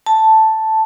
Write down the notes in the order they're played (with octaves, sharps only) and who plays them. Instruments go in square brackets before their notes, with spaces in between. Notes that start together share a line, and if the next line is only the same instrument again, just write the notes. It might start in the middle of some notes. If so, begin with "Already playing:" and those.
[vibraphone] A5